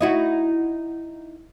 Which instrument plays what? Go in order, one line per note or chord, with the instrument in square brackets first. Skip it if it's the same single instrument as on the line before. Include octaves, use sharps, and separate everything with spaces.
[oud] D#4 E4 F#4